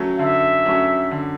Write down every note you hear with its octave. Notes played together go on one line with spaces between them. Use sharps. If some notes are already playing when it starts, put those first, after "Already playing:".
Already playing: F#3 A3 C#4
D3 E5
F#3 A3 C#4
D3